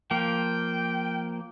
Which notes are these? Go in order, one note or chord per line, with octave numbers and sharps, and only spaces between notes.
F3 A#3 G5